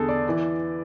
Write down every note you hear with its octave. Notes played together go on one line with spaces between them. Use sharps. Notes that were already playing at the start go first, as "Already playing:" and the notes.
Already playing: E2 D3 G#4 A4
D5
E3